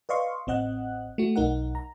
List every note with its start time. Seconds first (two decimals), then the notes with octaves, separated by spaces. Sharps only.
0.09 B4 D5 D#5 F5 C6 C#6
0.47 A1 C4 D#5 F#5 F#6
1.18 A3 F#4
1.36 B1 D#4 A#4 F#5
1.75 A#5